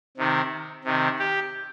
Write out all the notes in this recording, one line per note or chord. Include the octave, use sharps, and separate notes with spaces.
C3 D#3
C3 D#3
G4